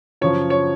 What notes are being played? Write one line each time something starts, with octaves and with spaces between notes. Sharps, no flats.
F#2 C#3 F3 C#5
C#5